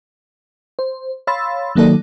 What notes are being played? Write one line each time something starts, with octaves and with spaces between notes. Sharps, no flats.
C5
C#5 F5 B5 C6 E6 A6
D#3 F#3 A#3 D#4 A4 D5